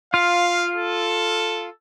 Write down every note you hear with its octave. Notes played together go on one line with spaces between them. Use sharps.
F4 F5
A4